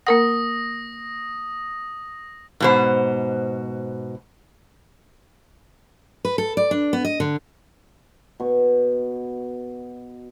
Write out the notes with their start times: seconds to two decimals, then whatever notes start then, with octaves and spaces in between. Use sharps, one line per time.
0.07 A#3 A#4 F#5 D#6 A#6
2.60 G#2 B2 C5
6.25 B4
6.38 A4
6.57 D5
6.71 D4
6.93 B3
7.05 D#5
7.20 D3
8.40 B2 C#6